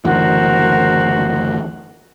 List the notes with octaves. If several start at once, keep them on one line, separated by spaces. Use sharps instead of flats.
F#1 D2 E3 F#4 A#4 C5